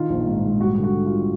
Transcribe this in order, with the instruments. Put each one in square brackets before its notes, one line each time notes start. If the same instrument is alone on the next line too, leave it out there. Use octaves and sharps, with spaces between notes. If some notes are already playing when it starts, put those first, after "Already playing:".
Already playing: [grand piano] D#3 F4
A#1
G#2
G#2
G3 F#4
D3
F#4
D3
F4
G3